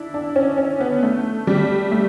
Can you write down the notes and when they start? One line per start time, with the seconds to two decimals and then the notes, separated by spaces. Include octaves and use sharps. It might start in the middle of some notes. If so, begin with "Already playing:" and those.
Already playing: D4 E4
0.14 D4
0.36 C#4
0.58 C#4
0.80 B3
1.03 A3
1.47 G3
1.91 A3